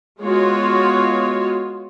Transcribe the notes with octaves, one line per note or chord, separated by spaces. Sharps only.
G#3 B3 F4 F#4 C#5